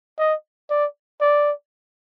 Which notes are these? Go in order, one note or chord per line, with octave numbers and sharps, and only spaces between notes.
D#5
D5
D5